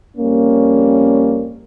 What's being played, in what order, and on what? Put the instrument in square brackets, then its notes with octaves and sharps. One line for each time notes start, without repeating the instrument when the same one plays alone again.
[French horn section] F2 G3 C#4 [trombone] A#3